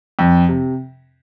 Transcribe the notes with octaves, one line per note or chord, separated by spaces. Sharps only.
F2
C3